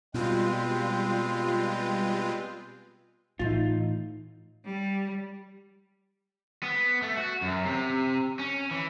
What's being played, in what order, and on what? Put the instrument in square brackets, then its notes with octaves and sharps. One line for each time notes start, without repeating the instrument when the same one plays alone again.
[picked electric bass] B2 [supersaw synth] G3 F4 [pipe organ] G#3 C4 B4
[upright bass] A2 E3 [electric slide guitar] D#4 F4
[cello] G3
[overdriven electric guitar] B3
A3
F#4
F#2
C3
C#4
E3